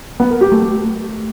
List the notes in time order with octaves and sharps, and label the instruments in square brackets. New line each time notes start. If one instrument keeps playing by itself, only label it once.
[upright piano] B3
A#4
G4
A3
A3